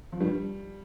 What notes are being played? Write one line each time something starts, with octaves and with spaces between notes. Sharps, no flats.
F3
G2 G3